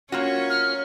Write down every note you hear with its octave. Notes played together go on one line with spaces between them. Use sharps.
A#3 C#4 F4 F#4 C#5
F6